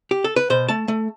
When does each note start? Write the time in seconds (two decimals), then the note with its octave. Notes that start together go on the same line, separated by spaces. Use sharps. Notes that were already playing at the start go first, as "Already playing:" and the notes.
0.11 G4
0.24 A4
0.36 B4
0.50 B2 C5
0.69 A3 A5
0.88 A3